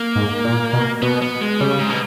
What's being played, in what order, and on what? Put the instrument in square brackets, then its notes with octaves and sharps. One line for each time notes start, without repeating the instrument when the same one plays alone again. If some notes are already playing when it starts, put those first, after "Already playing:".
Already playing: [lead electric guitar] A#3
[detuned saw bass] G#2
A#2
B2
[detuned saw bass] B2 [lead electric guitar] B3
[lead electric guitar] B3
G#3
[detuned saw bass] C#3 [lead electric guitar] G3
[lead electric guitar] G#2
B2